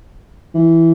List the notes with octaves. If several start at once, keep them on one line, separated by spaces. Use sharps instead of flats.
E3